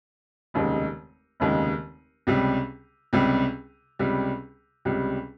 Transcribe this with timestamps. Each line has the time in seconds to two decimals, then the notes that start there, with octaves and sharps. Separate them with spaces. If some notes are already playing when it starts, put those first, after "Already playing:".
0.54 F1 D#2 C#3 G#3 D#4
1.40 F1 D#2 C#3 G#3 D#4
2.27 C#2 C3 G3
3.13 C#2 C3 G3
3.99 C#2 C3 G3
4.85 C#2 C3 G3